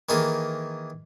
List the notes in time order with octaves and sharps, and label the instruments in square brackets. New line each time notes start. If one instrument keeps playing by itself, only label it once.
[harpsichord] D#3 E3 A#3 G#4 A4